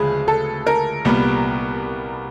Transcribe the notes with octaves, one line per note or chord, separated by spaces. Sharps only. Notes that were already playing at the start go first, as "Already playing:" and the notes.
Already playing: D2 C#3 F3 G#3 G#4 B4
A4
A#4
C2 A#2 G3 B3